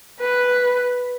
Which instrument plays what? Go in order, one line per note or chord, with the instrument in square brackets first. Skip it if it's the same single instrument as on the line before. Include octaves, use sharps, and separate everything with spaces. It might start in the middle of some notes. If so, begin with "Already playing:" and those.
[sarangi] B4